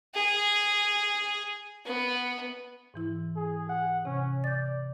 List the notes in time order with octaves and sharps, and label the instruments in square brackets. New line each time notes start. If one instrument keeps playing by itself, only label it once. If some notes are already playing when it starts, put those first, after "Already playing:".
[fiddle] G#4
B3
[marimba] G#2 E3 E4
[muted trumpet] G#4
F#5
[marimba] C3 [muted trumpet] C#4
[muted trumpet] D5 [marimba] G6 A6